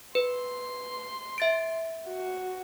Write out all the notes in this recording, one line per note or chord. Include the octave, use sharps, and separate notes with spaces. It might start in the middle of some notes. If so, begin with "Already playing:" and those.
B4 C6
E5 A6 D7
F#4